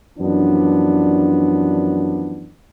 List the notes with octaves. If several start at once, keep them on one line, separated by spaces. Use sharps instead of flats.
F#2 E3 F3 B3 D4